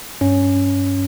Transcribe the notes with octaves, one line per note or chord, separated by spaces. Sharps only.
G2 C#4